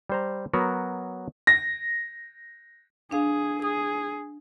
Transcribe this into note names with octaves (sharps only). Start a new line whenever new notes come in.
G3 C5 A#5
F#3 B3 F#4 A#4
A#6
D4 G#4 F5
G#4 D#6